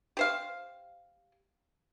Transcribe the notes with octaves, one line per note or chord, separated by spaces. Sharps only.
G4 C5 F5